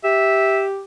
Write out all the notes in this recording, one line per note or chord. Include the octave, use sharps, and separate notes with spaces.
G4 E5